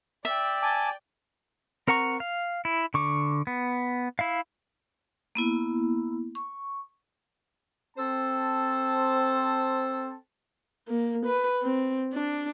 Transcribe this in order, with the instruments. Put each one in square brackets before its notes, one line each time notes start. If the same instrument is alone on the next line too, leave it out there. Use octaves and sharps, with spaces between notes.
[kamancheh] D5 G5 [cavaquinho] E5
[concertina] G#5 A5 D6
[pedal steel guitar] C4 A#4 F#5 A#5 C#6
F5
E4
D3 C#6 D6
B3
E4 E5 F5
[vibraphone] A#3 B3 E4
C#6
[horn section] C4 A4 C5 A5
[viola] A#3
B4
C4
D4